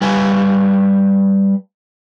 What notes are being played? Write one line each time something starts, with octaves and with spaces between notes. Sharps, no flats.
G3 B4 F5 G#5